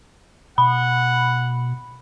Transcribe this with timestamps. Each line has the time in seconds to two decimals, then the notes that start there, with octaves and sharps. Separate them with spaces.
0.58 B2 F#5 B5